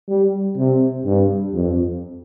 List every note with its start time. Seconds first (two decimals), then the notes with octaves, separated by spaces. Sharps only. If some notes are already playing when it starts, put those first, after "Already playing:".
0.09 G3
0.57 C3
1.05 G2
1.54 F2